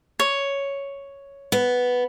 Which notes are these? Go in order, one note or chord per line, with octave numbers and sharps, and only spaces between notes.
C#5
B3